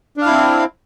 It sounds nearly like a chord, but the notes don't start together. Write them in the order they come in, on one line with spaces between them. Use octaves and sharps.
D4 F5 E4 C4